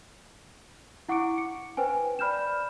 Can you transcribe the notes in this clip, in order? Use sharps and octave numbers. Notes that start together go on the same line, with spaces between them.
E4 F#5 C#6 D6 C#7 D7
C#7
B4 C5 G5 G#5
D5 B5 F6 G6 E7